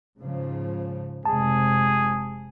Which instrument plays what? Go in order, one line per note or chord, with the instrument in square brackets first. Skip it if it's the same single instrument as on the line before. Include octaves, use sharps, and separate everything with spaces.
[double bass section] G#2 C#3 F3
[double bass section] F1 C3 G#3 [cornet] G#4 [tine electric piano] A5